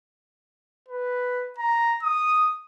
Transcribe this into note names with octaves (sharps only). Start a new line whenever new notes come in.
B4
A#5
D#6